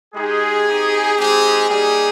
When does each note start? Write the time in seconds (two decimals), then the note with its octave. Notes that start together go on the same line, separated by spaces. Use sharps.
0.14 G#3 D#4 G4 G#4
0.66 C4 D#4 G4
1.17 G#3 C4 D#4 G4 G#4
1.69 G3 A#3 D#4 G4 G#4